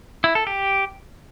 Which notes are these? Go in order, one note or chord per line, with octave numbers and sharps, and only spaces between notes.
E4
A4
G4